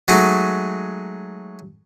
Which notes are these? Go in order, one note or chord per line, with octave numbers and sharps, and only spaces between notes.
F#3 G#3 A3 D#4 F#4